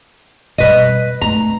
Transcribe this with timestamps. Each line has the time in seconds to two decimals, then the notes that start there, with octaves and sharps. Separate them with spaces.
0.58 B2 G3 B4 D#5
1.21 A3 D#4 A#5